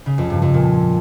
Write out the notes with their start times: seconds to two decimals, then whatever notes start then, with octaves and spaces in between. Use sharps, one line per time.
0.06 C#3
0.18 F2
0.30 G2
0.42 F2
0.54 A#2